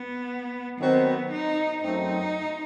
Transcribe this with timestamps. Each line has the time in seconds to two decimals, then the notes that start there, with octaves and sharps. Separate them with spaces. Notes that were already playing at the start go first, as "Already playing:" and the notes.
Already playing: B3
0.79 D#3 F#3 B3 C4 F#4
1.31 D#4
1.83 F#2 F#3 A3 C4 D#4